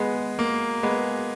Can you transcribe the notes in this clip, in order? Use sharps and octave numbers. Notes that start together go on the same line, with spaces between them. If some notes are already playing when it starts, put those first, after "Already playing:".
Already playing: G#3 B3
A#3
G#3 B3